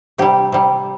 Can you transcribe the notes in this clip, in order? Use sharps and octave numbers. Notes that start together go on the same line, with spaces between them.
C3 G3 G4
C3 G3